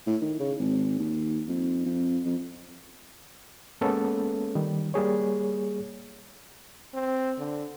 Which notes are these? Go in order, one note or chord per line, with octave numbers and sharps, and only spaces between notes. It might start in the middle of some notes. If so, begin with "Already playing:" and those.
A2
D#3
C#3
G#1
D#2
F2
F2
F2
G#3 A#3 B3 C#4 A4
D#3 G3
G3 A#3 G#4 C#5
C4
D3